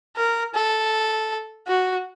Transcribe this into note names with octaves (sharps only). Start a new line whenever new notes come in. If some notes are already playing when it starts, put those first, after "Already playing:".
A#4
A4
F#4